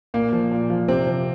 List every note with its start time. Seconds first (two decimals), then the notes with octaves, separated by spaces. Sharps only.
0.14 A#2 A#3
0.33 F3
0.52 A#2
0.70 F3
0.88 C3 C4
1.07 F3